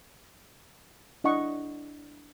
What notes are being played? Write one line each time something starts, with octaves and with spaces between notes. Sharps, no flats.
D4 E4 D#5 F#5 C#6